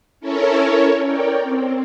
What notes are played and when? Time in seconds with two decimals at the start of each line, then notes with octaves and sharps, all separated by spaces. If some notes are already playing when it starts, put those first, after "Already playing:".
0.20 C#4 E4 A4 A#4 C#5
1.05 A#4 C#5 D5 G5
1.39 C4